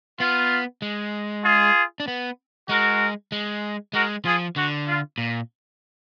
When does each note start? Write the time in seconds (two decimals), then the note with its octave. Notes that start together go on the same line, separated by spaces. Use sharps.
0.20 B3 F4
0.82 G#3
1.44 F4 G#4
2.00 D4
2.08 B3
2.69 G#3 F#4 A#4
3.32 G#3
3.93 G#3 F#4 A#4
4.25 F3 F4 G#4
4.56 D3 F#4
4.87 F4
5.18 A#2